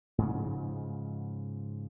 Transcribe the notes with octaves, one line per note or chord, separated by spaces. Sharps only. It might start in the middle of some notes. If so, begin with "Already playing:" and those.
G#2 C#3 F3